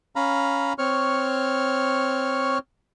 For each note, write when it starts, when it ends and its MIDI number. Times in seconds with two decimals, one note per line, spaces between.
0.16 0.73 61
0.16 0.73 77
0.16 0.73 82
0.16 0.73 83
0.78 2.58 60
0.78 2.58 73
0.78 2.58 85
0.78 2.58 89